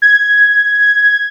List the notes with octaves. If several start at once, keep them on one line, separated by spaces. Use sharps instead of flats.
G#6